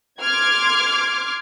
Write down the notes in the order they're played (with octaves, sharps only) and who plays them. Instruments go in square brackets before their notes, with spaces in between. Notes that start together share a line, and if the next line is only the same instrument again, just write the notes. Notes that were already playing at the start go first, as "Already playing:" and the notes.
[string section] C6 D6 F6 G#6